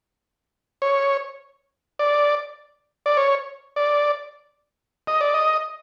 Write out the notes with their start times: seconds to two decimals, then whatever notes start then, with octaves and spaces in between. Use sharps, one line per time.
0.82 C#5
1.99 D5
3.06 D5
3.17 C#5
3.76 D5
5.07 D#5
5.21 D5
5.34 D#5